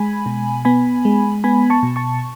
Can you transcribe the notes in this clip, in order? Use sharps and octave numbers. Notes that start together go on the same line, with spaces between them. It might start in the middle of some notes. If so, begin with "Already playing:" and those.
Already playing: G#3 G#5 B5
B2
B3 G#5 B5
G#3
B3 G#5 B5
A5 C#6
B2
A5 C#6